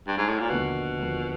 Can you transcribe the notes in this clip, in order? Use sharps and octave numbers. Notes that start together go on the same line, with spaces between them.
G2
G#2
A2
A#2
D#2 B2 D3 F3 A#3
D#2 D3 F3 A#3